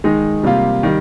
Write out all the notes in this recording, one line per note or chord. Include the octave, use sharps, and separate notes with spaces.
D#3 G#3 D#4
C3 G3 A#3 F4
D#3 G3